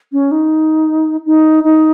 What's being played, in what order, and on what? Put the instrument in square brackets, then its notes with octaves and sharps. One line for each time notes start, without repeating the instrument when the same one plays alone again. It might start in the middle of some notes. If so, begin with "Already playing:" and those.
[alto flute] C#4
D#4
D#4
D#4